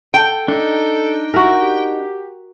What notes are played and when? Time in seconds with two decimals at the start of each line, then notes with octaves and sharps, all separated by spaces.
0.14 A4 G5
0.48 D4 D#4 A4
1.34 E4 F#4 A#4
1.61 G4